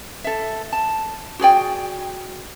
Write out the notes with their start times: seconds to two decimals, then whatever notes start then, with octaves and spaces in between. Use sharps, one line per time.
0.24 A4 E5
0.73 A5
1.39 F#4 G#4 D5 G5